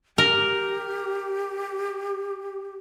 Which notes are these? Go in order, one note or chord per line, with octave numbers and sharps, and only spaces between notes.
G4 A#4